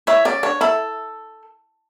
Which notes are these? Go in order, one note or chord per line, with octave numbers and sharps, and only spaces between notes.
E4 C#5 E5
C#4 D5
D4 C#5
E4 A4